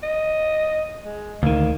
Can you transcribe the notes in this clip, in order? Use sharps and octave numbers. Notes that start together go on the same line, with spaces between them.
D#5
G#3
D2 D#3 A#3